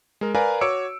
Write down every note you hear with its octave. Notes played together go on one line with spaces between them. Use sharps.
G#3 A#4
A#4 B4 D5 F5 G#5 A#5
F#4 C#5 D6 E6 C#7 D7